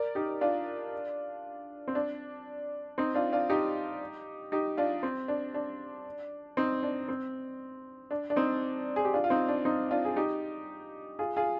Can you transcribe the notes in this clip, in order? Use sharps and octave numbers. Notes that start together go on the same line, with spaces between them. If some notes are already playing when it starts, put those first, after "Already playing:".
Already playing: A#4 D5
D#4 G4
D4 F4
C4
D4
C4 D#4
D4 F4
D4 F4
D#4 G4
D#4 G4
D4 F4
C4
D4
D4
C4 D#4
D4
C4
D4
D4
C4 D#4
G#4
G4
D4 F4
F4
C4 D#4
D4
C4 D#4
D4 F4
G#4
D#4 G4
F4 G#4
F4 G#4